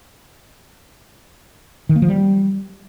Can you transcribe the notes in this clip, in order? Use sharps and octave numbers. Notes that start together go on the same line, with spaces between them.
D#3
A#3
F3
G3